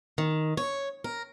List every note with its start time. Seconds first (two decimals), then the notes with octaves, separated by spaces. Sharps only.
0.18 D#3
0.57 C#5
1.04 A#4